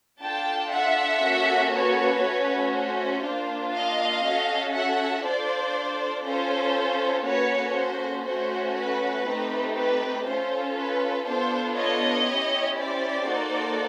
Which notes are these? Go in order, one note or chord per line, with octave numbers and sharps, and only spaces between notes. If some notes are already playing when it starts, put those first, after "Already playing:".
D4 F4 A4 G5 A5
E5 F#5
A#3 C#4 F#4 A4
B4 C#5
A3 C#4 F#4
C5
A#3 D4 F4
D#5 F5
C#4 F#4 A4
E5 F#5
D4 F4 A4 C5 D5
C#4 F4 A4 C5
A#3 C#4 F#4 A4 B4 C#5
C5
A3 C#4 F#4 C5
B4
A3 C4 D#4 G4
B4
C#4 F4 A4 C5
B4
B3 D4 F4 A4 C5
C#5 D#5
C#4 E4 G4
C5 D5
A#3 D#4 F#4 A4